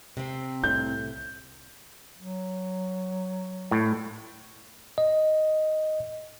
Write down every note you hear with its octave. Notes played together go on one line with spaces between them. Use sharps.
C3 C4
C2 A2 G6
F#3
A2
D#5